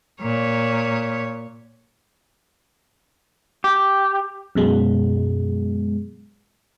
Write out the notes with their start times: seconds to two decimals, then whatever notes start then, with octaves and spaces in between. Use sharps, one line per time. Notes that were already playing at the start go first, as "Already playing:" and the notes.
0.21 A#2 C#5
3.64 G4
4.55 F#2 B2 G#3